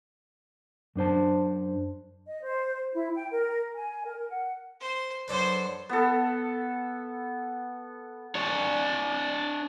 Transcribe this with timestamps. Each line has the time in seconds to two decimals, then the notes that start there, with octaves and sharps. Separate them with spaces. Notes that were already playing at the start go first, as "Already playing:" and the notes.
0.96 F#2 D4 C5 A5
2.27 D#5
2.44 C5
2.93 E4
3.15 G5
3.31 A#4
3.75 G#5
4.05 A#4
4.29 F#5
4.80 C5
5.28 F#2 D4 A4 B4 C5
5.89 B3 A4
8.35 D4 C#5